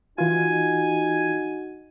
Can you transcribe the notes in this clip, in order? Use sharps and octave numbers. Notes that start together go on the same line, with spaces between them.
E3 D#4 F4 F#4 G#5